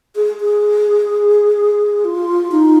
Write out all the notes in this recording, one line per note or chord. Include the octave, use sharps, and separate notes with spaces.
G#4
G#4
F4
D#4